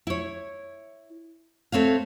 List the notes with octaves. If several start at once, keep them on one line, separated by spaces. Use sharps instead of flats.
E4 C#5
A3 C4 C#5 F5